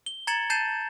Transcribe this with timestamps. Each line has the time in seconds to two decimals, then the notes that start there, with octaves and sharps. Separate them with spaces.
0.06 G7
0.27 A#5 G#6 A6 C#7 E7 F#7
0.50 A5 G6 A6 C7 E7